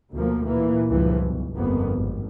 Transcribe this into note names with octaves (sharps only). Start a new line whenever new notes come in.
D2 B2 F3 A#3
A#2 E3 A#3
C#2 G2 A#2 E3 F3
B1
G1 F2 A#3 B3
G#1